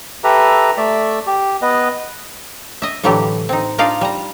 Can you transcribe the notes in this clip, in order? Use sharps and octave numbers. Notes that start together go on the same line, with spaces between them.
G4 A4 B4 E5 A#5
A3 D5 E5
G4
B3 B4 D#5
D#5 E5
A2 D3 E3 F#3 A3 G4
C4 D#4
D4 D#4 F4 D5 F5
G3 A#5